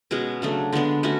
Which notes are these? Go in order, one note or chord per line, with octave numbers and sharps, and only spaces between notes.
B2 G#3 C#4 G#4
C#3 F#3 A3 D4
D3 G#3 B3 D4
A3 C#4 F#4